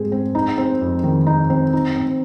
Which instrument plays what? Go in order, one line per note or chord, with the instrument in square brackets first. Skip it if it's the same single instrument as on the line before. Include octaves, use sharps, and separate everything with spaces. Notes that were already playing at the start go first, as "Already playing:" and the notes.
Already playing: [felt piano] G#2 G#3 C4 G#4
C4
D#4
C4
F2
D#3
D#4
C4
D#4
C4